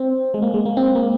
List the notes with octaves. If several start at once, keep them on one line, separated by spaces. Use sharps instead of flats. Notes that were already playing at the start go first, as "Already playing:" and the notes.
Already playing: C4
G#3
A#3
G#3
A#3
C4
A#3